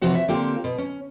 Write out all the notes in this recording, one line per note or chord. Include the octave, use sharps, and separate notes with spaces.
C3 E3 F3 F#4 C#5
E5
D3 A#3 C4 F4 G4
B2
C#4